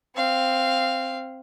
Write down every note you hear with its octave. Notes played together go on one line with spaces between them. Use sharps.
C4 F5